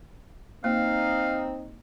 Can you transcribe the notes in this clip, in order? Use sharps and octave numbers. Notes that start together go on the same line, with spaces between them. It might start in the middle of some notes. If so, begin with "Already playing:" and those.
A#3 C4 D#4 F5